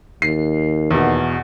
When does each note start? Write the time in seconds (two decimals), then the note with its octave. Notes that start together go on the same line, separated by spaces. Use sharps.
0.22 D#2 C7
0.91 E2 B2